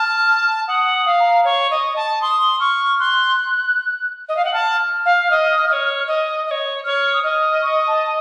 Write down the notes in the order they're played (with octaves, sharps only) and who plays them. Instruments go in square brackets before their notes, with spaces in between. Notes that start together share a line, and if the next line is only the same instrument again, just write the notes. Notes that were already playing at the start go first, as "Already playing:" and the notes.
Already playing: [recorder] A5 [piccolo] F6
[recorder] F#5 [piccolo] D#6
[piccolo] D#6
[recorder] F5
[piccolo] A#5
[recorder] C#5 [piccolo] C#6
[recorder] D#5
A5
[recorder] C6 [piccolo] D#6
[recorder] C#6 [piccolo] F6
[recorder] C6 [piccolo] F#6
[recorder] D#5
F5
F#5
[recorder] A5 [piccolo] F6
[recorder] F5
D#5
D#5
C#5
D#5
D#5
C#5
[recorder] C#5 [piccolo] F6
[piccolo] D#6
[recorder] D#5 [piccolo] F6
[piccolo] C#6
A5